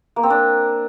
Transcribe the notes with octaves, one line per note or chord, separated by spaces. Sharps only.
A#3
C4
D4